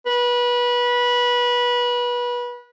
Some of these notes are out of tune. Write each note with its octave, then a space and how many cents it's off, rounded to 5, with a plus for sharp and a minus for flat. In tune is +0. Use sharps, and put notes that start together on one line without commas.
B4 -25